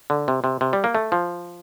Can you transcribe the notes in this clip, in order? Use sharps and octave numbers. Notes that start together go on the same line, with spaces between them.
D3
C3
C3
C3
G3
A#3
A3
F3